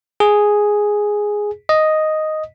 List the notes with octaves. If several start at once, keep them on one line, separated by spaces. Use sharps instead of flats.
G#4
D#5